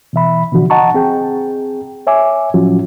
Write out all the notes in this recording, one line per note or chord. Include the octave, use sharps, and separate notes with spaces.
B2 E3 E5 B5
B2 D3 E3 F3 D4 F#4
D#5 F#5 A5 A#5 C#6
C4 G#4 G5
C#5 E5 G#5 D6
A2 F3 F#3 C#4 F4 F#4